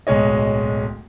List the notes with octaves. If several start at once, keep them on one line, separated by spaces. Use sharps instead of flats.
D1 B1 G#3 C#5 D#5